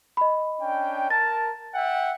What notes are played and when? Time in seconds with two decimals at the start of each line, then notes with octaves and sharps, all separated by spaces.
0.17 D#5 B5
0.62 C#4 D4 G5
1.10 A#4 A5 A6
1.74 E5 F#5 G5